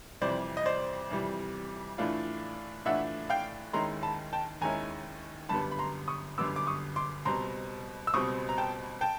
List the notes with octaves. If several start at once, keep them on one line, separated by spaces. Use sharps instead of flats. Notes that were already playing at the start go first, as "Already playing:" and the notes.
F2 C3 E3 G3 C5 D5
D#5
C5 D5
F2 C3 E3 G3
A2 E3 A3 D4 F4
A2 E3 A3 D4 F4 E5 F#5
F5 G5
D#2 D#3 G#3 C#4 E4 A#5 C6
A5 B5
G5 A5
D#2 D#3 G#3 C#4 E4 G#5 A#5
G1 F#2 D3 G3 B3 A5 B5
B5
A#5 C6
C#6 D#6
G1 F#2 D3 G3 B3 D6 E6
D6
C#6 D#6
C6 D6
C#2 B2 G3 C4 A#5 C6
E6
C#2 B2 G3 C4 C#6 D#6
A#5
G5 A5
G5 A5